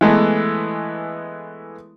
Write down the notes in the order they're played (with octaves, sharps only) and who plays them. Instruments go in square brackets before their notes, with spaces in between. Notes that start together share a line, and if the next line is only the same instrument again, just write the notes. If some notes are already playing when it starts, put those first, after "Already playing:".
[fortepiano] E3 G#3 A3 B3